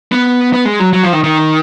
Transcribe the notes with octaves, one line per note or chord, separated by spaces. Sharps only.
B3
B3
G#3
F#3
F#3
F3
D#3
D#3